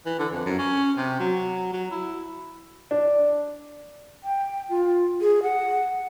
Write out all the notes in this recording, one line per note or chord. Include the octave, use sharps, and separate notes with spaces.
E3
D3
F2
F#2
C#4
C3
F#3
F#3
E4
D4
G5
F4
G#4
F#5